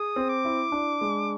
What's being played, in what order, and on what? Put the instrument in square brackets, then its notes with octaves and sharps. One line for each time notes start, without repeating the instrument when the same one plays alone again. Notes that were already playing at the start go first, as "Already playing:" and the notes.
Already playing: [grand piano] G#4 [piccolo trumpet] D#6
[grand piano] C4
[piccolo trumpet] D6
[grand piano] E4
D4
G#3